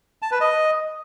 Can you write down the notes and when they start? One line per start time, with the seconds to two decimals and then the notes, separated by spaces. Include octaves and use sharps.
0.22 A5
0.31 B4
0.41 D#5